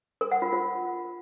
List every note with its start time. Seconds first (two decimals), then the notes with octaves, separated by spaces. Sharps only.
0.21 A#4
0.32 F#5
0.42 F4
0.53 F4